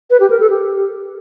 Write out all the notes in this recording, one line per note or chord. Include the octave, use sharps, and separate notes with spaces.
B4
G4
A#4
A4
G4